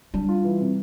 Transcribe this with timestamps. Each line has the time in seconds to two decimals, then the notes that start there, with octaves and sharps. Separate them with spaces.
0.14 G3 D4
0.28 F4
0.44 E3
0.60 C3